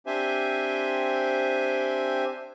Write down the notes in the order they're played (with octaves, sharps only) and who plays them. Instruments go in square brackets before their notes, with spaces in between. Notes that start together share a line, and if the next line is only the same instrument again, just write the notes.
[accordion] C4 D4 G4 C5 E5 G#5